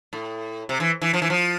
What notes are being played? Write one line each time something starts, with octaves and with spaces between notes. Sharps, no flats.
A2
C3
E3
E3
F3
E3
F3